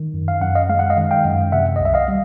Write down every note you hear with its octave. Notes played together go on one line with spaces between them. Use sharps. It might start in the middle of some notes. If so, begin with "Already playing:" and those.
Already playing: D#3
F#2
F5
F#2 F#5
D#5 F5
G#3 F5
F#5
D#5 F5
D#3
F5 G5
F#2
C3 E5 F#5
C2 D#5
E5
D#5 F5
G3